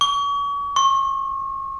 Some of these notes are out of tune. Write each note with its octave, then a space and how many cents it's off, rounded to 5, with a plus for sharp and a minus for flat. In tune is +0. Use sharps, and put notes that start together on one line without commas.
C#6 +35
C#6 -40